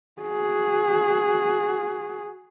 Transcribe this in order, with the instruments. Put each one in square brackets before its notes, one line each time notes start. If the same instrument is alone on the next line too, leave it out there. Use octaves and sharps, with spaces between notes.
[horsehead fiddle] F#4 G#4